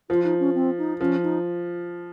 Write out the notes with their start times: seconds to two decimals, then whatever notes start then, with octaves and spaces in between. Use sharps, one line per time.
0.09 F3 F4
0.24 D#4
0.40 C#4
0.55 C4
0.78 D#4
1.00 F3 C#4
1.23 D#4